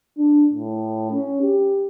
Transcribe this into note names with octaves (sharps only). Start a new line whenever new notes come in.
D4
A2
C#4
G4